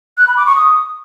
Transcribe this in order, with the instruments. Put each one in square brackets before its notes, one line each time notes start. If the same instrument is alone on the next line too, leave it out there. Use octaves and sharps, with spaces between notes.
[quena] F#6
B5
D6
C#6
D#6